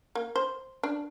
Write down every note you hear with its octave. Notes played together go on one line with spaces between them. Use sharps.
A#3
C5
D4